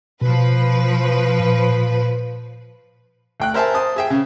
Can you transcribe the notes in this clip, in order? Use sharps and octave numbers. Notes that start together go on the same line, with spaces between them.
B2 F3 B4
A#2
D2 G5 F#6
A#4 C5 E5 G#5 A5
C5 A5 D#6
G#4 E5 G5
C#3